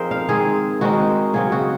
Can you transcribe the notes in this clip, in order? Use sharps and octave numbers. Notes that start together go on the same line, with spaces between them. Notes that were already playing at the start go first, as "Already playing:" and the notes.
Already playing: F3 C4 D#4 G#4 A#4 C5
F5
D#3 G#3 C4 G#4
D#3 G#3 C4 D#4 F#4
C#3 F#3 C4 G#4
F#4